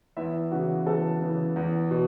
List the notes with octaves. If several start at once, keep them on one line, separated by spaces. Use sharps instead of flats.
E2 E4 E5
C#3 E3 F#4 F#5
E2 A4 A5
C#3 E3
E2
B2